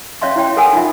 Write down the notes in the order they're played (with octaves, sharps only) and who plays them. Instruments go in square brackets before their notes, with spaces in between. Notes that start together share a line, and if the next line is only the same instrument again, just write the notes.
[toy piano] C#4 C#5 E5 F5 C6 C#6
E4 F#4 C#5 G5
A4 A#4 F#5 G#5 E6
D#4 F4 E5